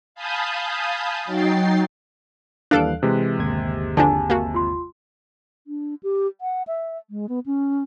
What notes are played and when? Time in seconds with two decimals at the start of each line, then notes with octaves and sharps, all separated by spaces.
0.15 F5 G#5 A5 B5 D#6 G6
1.25 F#3 D#4 G5 A6 C7
2.71 D#2 E3 G3 D4 A4 F5 F#6 D7
3.03 C3 E3 G#3
3.39 G1 D#2 G#6
3.97 D3 F3 D4 G#5 A5
4.30 A#3 F#4
4.54 F4 C6
5.67 D4
6.03 G4
6.41 F#5
6.67 E5
7.10 G#3
7.29 B3
7.46 C#4